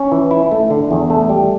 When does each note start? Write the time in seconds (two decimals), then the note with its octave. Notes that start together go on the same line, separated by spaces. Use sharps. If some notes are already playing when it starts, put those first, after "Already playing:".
Already playing: C#4
0.12 E3
0.31 E4
0.51 A3
0.70 D3
0.91 E2
1.10 A3
1.29 G3